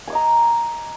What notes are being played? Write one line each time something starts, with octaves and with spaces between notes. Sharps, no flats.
D#5 G#5 A#5 D6